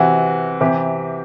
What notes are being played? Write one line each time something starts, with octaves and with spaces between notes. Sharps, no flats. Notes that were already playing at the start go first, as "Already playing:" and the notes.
Already playing: C3 E3 F#4
C3 E3 G4